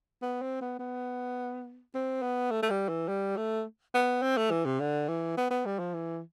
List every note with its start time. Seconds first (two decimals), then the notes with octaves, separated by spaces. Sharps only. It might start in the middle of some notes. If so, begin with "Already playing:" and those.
0.22 B3
0.42 C4
0.61 B3
0.79 B3
1.95 C4
2.22 B3
2.51 A3
2.63 A3
2.70 G3
2.89 E3
3.08 G3
3.37 A3
3.94 B3
4.22 C4
4.37 A3
4.51 E3
4.65 C3
4.80 D3
5.08 E3
5.37 B3
5.51 B3
5.66 G3
5.79 F3
5.94 E3